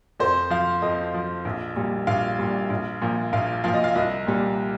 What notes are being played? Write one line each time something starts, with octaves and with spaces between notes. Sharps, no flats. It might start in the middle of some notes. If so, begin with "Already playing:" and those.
F2 C5
F3 F5
F2 D#5
F3
A#1
A#2 G3
A#1 F5
A#2 G3
A#1
A#2 F3
A#1 F5
A#2 F3 F5
D#5
F5
C2 D#5
A#2 G3